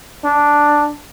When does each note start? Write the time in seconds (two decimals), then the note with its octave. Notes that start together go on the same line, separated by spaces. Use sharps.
0.24 D4